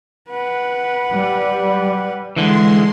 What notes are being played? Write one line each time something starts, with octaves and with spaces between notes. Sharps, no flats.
B4 F#5
G3
D3 E3 G#3 C6